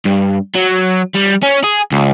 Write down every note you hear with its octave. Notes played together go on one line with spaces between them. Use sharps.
G2
F#3
G3
C#4
G#4
C#2